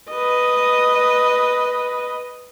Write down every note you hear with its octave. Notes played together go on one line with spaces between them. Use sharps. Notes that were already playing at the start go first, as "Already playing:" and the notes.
B4 D#5